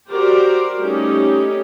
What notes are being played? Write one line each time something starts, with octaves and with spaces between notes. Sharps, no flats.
F#4 G4 A#4 C5 D5
G3 A3 C#4 D#4 G4